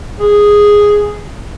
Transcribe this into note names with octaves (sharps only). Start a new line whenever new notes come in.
G#4